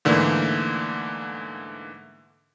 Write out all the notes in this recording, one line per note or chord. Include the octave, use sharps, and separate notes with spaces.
G#2 D3 E3 A3 A#3